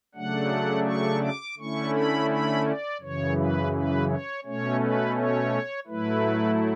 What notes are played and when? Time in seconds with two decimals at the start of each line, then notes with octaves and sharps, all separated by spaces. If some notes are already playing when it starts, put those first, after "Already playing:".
0.15 C#3 F#3 A3 D4 F#5
0.87 C#6
1.23 D6
1.58 D3 A3 C#4 E4 C#6
1.94 B5
2.30 B5
2.65 D5
3.01 F#2 C#3 E3 C#5
3.36 B4
3.73 B4
4.09 C#5
4.44 B2 A3 C#4 C#5
4.80 B4
5.16 C#5
5.87 A2 F#3 A3 E4 B4